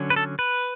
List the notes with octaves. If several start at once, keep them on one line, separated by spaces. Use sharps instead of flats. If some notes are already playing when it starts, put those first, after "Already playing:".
Already playing: D3 F#3 C#4
B4
A4
B4